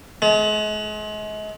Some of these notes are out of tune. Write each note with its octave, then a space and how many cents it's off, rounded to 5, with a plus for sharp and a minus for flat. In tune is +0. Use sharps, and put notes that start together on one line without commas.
G#3 +40